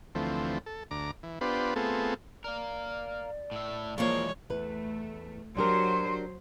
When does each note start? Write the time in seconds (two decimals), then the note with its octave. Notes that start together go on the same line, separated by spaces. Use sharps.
0.15 D2 E3 F3 A3 C4
0.66 A4
0.91 D2 A#5 D6
1.23 E3
1.41 B3 D4 F4 G4 B4 C5
1.76 A3 B3 C4 F4 G#4 A4
2.44 A#4 D5 F5
3.52 A2 E5
3.98 E3 F3 G#3 A#3 C5 C#5
4.50 E2 A3 B4
5.57 F#3 D4 G4 A#4 C5 C6